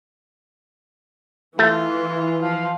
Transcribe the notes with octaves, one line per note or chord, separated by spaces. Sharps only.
E3 A3 F4
F3 F5